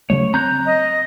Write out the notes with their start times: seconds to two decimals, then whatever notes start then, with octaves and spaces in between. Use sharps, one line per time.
0.10 C#3 F#3 A3 C#5
0.34 C4 A#5 F#6 G6
0.66 D#5